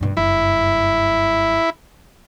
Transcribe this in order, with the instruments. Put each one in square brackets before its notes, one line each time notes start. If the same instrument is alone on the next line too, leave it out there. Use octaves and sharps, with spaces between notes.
[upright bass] G2 B2
[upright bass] F#1 G2 [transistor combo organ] E4